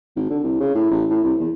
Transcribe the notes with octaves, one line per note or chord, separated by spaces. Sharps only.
G#1
D3
C2
C#3
A2
A1
A2
C2
E2